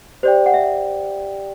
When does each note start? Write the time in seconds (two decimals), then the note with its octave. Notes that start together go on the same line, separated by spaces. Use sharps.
0.23 G4 C5 D5 G5
0.46 F#5
0.54 E5